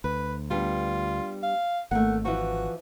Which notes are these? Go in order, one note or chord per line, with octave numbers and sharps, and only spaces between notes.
D2 B4
G3 B3 D4 F4
F5
G#1 A3 A#3 F#5
E3 F3 F#4